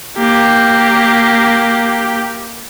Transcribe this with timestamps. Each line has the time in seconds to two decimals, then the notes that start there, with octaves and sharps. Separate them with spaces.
0.17 A#3 G4